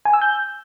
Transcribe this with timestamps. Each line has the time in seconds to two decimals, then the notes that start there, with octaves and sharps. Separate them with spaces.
0.05 G#5
0.13 E6
0.22 G6